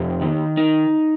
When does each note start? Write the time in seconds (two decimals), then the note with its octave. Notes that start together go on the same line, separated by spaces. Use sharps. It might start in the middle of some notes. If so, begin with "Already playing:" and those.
Already playing: F2 G4 G5
0.21 D#3
0.57 D#4